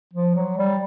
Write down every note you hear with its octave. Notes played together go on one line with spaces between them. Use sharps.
F3
F#3
G3